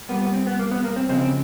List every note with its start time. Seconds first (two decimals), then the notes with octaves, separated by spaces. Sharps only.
0.09 A#2 G3 A#3 B3
0.22 B3
0.34 C4
0.47 B3
0.59 A#3
0.71 B3
0.84 A#3
0.96 C4
1.09 C#2 C#3 F3 G#3 C4
1.21 C4